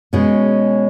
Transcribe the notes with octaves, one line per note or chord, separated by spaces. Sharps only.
B2 G#3 C#4